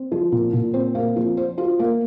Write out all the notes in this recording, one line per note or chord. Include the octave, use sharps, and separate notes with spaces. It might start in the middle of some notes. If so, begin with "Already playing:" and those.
Already playing: C4
F3
A#2
A#2
C4
A#3
F3
C5
F4
A#3